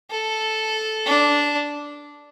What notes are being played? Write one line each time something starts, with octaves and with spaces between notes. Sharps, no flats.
A4
D4